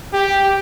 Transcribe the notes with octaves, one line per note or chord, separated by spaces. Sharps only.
G4